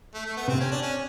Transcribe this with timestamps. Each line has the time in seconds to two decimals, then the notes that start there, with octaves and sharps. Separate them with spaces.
0.14 A3
0.26 A3
0.37 B3
0.48 C3 C4
0.60 C#4
0.71 D4
0.82 C#4